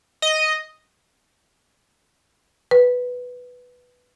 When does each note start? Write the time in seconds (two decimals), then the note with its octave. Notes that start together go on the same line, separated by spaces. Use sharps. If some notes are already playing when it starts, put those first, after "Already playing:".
0.22 D#5
2.71 B4